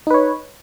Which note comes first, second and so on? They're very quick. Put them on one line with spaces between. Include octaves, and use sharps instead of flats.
D#4 B4 C#5